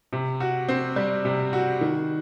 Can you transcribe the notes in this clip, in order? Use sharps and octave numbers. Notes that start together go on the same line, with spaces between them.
C3
F#4
C4
G3
C3
F#4
D#3